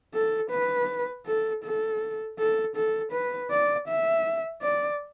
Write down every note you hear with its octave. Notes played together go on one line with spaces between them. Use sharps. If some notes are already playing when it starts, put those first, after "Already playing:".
A4
B4
A4
A4
A4
A4
B4
D5
E5
D5